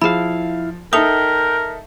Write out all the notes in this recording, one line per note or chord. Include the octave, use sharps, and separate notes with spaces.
F3 E4 G#4 F5 B5
D#4 A4 A#4 E5 G5 D#6 F7